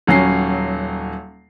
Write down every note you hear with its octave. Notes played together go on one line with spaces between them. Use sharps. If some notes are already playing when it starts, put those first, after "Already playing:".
D#1 F#3 C#4 C7